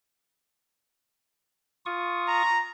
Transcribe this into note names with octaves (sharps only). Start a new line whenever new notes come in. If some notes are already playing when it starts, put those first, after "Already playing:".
F4 C#6 D#6
A#5